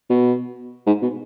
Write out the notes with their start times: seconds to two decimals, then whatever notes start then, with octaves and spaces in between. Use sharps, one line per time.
0.10 B2
0.87 G#2
1.02 B2